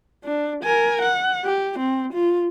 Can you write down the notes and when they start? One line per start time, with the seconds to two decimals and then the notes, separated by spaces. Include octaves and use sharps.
0.24 D4
0.63 A#4 G#5
1.02 F#5
1.45 G4
1.79 C4
2.13 F4